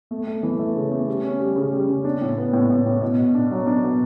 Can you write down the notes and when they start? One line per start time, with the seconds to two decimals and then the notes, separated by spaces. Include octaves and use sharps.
0.11 A3
0.27 A3
0.43 E3
0.59 A3
0.75 C#3
0.91 A3
1.08 G3
1.24 C#4
1.40 G3
1.56 C#3
1.73 G3
1.89 C#3
2.05 D4
2.21 A2
2.37 B3
2.53 A2
2.69 A2
2.86 A2
3.02 B2
3.18 B2
3.35 D4
3.51 F#3
3.67 D4
3.83 B2